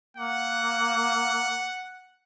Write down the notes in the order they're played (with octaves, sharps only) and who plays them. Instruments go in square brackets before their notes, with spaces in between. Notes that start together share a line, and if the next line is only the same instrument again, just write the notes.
[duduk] A#3 [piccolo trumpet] F#5